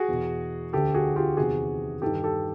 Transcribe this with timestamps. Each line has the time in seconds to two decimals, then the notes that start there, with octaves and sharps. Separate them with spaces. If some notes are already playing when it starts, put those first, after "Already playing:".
Already playing: F#4 G#4
0.09 E2 B2
0.73 D2 D3 G4 A4
0.94 F#4 G#4
1.16 F4 G4
1.37 E2 C3 D#3 F#4 G#4
2.02 G2 D#3 G4 A4
2.24 G4 A4